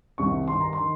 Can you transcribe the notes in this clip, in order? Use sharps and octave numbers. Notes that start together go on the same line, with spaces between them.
C2 C3 D#3 C#6
G2 D#3 C6
A#5
C6
D#3